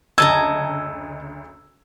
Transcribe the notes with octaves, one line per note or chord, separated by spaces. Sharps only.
F#1 D2 D#5 A5 A#5 E6 G#6